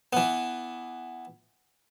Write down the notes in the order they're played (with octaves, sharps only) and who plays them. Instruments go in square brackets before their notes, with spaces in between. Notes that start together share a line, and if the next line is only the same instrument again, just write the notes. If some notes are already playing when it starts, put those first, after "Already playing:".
[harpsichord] E3 B3